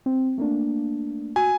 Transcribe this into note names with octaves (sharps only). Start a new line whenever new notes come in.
C4
A3 A#3 D4
F#4 G#5